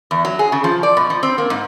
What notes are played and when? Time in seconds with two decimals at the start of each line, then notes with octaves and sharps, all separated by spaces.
0.11 E2
0.25 F#3
0.39 G#4
0.52 C#3
0.64 F3
0.83 D5
0.97 B2
1.10 F3
1.23 C4
1.38 A#3
1.50 G#2